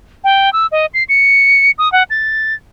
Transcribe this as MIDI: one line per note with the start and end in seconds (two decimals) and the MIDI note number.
0.24 0.52 79
0.53 0.67 88
0.72 0.86 75
0.94 1.04 96
1.09 1.71 97
1.78 1.91 87
1.92 2.03 78
2.10 2.54 93